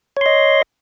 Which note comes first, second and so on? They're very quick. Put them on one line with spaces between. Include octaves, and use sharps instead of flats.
C#5 C6 D#5